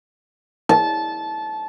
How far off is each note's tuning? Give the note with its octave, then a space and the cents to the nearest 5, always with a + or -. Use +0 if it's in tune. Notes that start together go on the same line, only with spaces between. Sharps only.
A5 -20